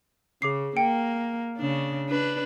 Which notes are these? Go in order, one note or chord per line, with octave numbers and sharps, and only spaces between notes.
C#3 G#4 D6 C7
A#3 G5 C#7 D7
C#3 D4
D4 B4